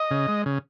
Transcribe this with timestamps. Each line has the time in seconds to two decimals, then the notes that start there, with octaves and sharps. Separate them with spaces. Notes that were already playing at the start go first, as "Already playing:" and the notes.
Already playing: D#5
0.11 C#3
0.28 G#3
0.46 C#3